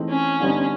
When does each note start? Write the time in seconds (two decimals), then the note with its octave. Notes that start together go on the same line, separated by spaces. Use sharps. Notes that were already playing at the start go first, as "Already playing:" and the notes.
Already playing: E3 A3 C4 D#4 G#4
0.10 C#4
0.40 D3 G3 B3 D#4